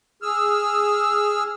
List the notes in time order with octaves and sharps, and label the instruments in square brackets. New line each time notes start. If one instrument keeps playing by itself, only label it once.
[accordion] G#4 E6 F6